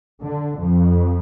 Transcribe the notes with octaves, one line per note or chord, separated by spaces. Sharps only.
D3
F2